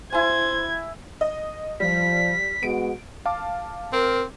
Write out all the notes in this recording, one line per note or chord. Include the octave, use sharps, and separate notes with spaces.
E4 C5 G#5 G#6
D#5
F3 G3 B6
G#3 B3 F#4 D7
F5 A5 D6
C4 A#4